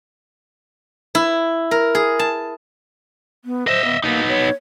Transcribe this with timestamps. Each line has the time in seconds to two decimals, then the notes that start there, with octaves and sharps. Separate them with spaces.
1.15 E4
1.71 A#4
1.95 G#4
2.19 A5
3.45 B3
3.67 C5 D#5 E5
3.85 B3
4.04 A#3 B3 D#4
4.28 C#5